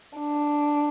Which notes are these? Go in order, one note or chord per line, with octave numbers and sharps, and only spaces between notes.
D4